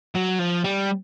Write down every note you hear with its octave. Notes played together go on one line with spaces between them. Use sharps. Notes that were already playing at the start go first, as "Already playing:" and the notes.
F#3
F3
G3